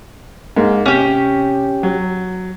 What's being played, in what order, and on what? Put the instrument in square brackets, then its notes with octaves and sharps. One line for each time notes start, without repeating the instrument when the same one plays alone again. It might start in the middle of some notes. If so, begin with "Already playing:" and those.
[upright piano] G#2 A#3
[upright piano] C3 [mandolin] C#4 G4
[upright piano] F#3